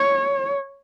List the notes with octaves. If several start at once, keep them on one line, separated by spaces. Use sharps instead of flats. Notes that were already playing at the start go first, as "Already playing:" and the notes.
Already playing: C#5